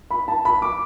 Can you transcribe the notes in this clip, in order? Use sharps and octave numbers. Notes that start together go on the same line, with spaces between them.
B5
A5
B5
D6